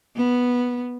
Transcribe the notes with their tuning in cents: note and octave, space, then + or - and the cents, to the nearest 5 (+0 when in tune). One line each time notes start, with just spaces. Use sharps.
B3 -5